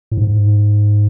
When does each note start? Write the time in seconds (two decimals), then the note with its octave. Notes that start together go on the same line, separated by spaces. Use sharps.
0.12 A2
0.17 G#2